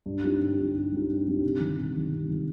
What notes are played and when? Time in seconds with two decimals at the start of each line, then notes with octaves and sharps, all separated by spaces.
0.06 G2
0.24 G3 C4 D#4 G4
0.41 G2
0.58 G3 C4 D#4 G4
0.75 G2
0.91 G3 C4 D#4 G4
1.09 G2
1.27 G3 C4 D#4 G4
1.44 C3
1.60 D#3 G3
1.78 C3
1.94 D#3 G3
2.13 C3
2.29 D#3 G3